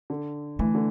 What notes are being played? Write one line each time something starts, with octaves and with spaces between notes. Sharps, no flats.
D3
E3 A3
D3